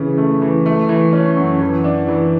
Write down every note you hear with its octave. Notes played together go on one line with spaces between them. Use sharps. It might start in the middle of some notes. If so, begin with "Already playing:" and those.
Already playing: C#3 E3
A3
E3
A3
E3
C#4
F#2
E3
D4
E3